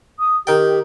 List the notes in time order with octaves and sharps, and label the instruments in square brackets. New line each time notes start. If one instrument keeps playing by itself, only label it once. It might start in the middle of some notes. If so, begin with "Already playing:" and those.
[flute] D#6
[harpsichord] D#3 G5 [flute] G4